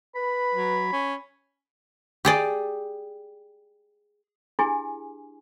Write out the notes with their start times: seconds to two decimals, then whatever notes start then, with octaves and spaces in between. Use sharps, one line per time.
0.15 B4 B5
0.55 F#3
0.93 C#4
2.25 G4 G#4 D5
4.59 D4 E4 G4 G#4 G#5